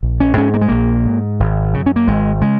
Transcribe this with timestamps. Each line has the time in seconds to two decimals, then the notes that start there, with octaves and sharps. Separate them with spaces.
0.03 A#1
0.20 C#4
0.37 G#2 C#4
0.54 A#3
0.61 G#3
0.68 A#1 A#3
1.05 G#2
1.40 G#1
1.73 F#2 C#3
1.86 C#4
1.96 A#3
2.07 G#1 G#3
2.41 C#3 G#3